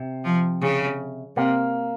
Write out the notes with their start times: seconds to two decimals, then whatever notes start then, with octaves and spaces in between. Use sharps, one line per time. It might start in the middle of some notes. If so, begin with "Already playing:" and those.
Already playing: C3
0.24 F3
0.62 C#3
1.36 C3 A#3